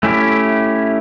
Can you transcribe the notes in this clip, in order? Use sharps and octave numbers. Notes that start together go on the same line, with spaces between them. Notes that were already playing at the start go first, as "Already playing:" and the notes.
A3 C#4 E4 G4